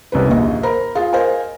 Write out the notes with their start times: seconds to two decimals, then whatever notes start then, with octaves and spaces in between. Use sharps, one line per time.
0.12 C2 C#4 B4
0.28 A#1 D#2 D#5
0.63 A#4 C5 A#5 B5
0.95 F4 G#4
1.13 A#4 C5 D#5 F5 G#5